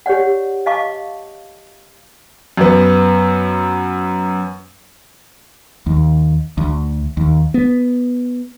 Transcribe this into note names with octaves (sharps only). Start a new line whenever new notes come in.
G4 C#5 D5 F#5
D#5 F5 A5 C#6 D6
F#2 B3
D#2
D2
D#2
B3